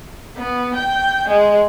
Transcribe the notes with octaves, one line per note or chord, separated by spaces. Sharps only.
B3
G5
G#3